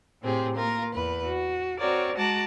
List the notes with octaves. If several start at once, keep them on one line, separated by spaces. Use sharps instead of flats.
A2 C3 C4 G#4
A#3 F4 A#4
E2 B4
F#4
C4 F#4 A#4 C#5 D5
G#3 F#4 A5 A#5 D6 F#6